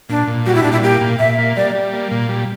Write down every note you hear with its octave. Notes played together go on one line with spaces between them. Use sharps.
A#2 D4
A#2
G3 F#4
E4
A#2 D4
E4
A#3 G4
A#2
A#2 E5
A#3
G3 D5
G3
A#3
A#2
G3